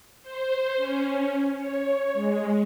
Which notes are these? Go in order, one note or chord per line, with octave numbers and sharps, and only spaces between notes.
C5
C#4
C#5
G#3